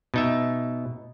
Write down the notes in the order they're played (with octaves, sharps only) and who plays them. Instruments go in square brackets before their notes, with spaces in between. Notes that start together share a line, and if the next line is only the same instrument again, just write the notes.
[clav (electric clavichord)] B2 D#4 E5